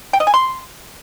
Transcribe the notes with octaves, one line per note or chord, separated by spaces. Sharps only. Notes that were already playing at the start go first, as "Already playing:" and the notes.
G5
D#5
G#5
C6